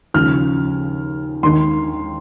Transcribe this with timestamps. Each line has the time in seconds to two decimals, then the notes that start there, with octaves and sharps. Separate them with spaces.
0.14 D#2 C#3 F3 F6
1.43 D#2 D#3 C6